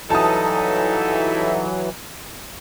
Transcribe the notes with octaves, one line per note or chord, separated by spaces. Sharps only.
G2 E3 F#3 D#4 E4 A4 A5 D#6